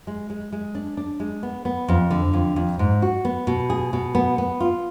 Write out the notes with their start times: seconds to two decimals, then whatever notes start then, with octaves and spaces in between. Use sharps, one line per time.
0.07 G#3
0.30 G#3
0.52 G#3
0.75 D4
0.97 D4
1.20 G#3
1.43 B3
1.65 B3
1.88 F2
2.11 D3
2.33 F2
2.56 F2
2.79 G#2
3.02 F#4
3.25 B3
3.47 B2
3.70 G#4
3.93 B2
4.15 B3
4.38 B3
4.60 F4